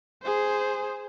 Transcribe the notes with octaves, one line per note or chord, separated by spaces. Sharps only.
G#4 C5